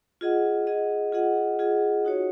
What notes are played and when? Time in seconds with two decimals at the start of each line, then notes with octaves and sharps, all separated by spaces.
0.21 F4 G#4 D#5 F#5
0.67 F4 G#4 D#5 F#5
1.12 F4 G#4 D#5 F#5
1.59 F4 G#4 D#5 F#5
2.05 D#4 F#4 C#5